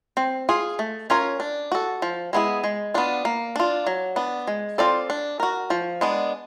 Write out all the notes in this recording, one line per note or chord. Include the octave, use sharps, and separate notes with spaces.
C4
F4 G#4
A3
C#4 F4 A#4 C#5
D4
F#4 A4
F3
G#3 B3 E4 G#4
G#3
B3 D4 F4
A#3
D4 F4
F#3
B3 D4
G#3
C4 F4 A4 D5
D4
F#4 A#4
F3
G#3 B3 D4